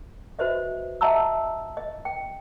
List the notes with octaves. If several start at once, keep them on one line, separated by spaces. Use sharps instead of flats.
F#4 B4 C5 D#5 E5
D#5 E5 F#5 A5 A#5 E6
D#5
G5